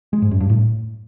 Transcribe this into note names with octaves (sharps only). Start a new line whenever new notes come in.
G#3
G#2
F#2
G2
A2